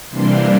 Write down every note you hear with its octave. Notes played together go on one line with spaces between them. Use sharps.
C3 E3 G3 A#3 D4 C6